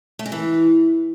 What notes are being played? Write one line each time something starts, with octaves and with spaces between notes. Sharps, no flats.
A3
G#3
E3